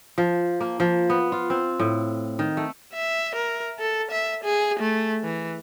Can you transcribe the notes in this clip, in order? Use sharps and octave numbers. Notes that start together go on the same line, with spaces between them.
F3
A#3
F3
B3
F4
C4
A2
D#3
A3
E5
A#4
A4
E5
G#4
A3
E3